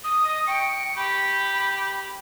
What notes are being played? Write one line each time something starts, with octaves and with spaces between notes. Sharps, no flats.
D#6
D#5
G5 C#6
G4 B5